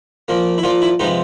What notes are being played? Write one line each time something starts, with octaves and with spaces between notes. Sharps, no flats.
A#2 F3 A#3
E4
A#2 F3 A#3 F4
E4
C3 F3 G#3 B3 D#4